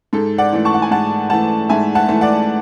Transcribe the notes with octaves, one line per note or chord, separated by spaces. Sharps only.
G#2 A4
D5 F#5
E3 A3
A5 C#6
F#5
G#5
G#2 F#5 A5
E3 A3 F#5 A5
G#2 E5 G#5
F#5 A5
E3 A3
D5 F#5